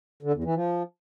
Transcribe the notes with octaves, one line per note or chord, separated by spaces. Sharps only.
D3
E2
E3
F3